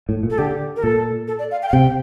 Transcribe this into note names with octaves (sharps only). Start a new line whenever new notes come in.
A2
A#2
A4
D3 G4
A#4
A#2 A4
A4
D5
F5
G5
F5
C3 G5